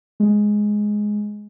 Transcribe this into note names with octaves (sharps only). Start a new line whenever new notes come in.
G#3